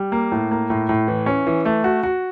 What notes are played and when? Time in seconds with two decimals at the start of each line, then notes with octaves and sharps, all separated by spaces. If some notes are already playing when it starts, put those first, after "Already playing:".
Already playing: G3
0.12 A#3
0.32 A2
0.51 A#3
0.70 A2
0.89 A2
1.08 E3
1.26 C#4
1.47 E3
1.65 A3
1.84 F#4
2.03 F#4